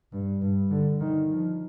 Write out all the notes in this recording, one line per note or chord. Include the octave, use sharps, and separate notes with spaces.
G2
G2
D3
D#3
F3